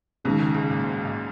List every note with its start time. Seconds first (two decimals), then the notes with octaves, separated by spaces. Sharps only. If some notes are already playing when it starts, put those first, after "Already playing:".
0.24 B1 B2 D#3 G#3 C#4
0.39 C#2 C#3
0.54 C#2 C#3
0.70 A#2
0.84 G#2
1.05 A#2